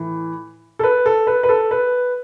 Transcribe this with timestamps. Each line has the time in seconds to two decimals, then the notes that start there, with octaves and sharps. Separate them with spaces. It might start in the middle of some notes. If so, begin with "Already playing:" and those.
Already playing: A2 E3
0.79 A4
0.83 B4
1.06 A4
1.27 B4
1.43 B4
1.49 A4
1.71 B4